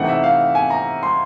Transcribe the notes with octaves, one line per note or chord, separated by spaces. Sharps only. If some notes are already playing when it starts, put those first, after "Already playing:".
Already playing: C3 E3 A3 C4 D#4 F#5
E5
F5
G#5
A#5
C6